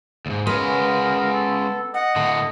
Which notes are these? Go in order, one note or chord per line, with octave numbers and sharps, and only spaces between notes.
D2 G#2
G#3 B3 C#4 A#4
A4
D#5 F#5
A2 D3